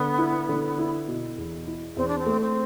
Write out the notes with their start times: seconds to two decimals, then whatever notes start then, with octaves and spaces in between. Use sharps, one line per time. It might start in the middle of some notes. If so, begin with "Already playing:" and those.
Already playing: D3 B3
0.18 E4
0.49 D3
0.78 E4
1.08 B2
1.38 E2
1.67 E4
1.97 E2 C4
2.08 D4
2.19 C4
2.26 A3
2.41 C4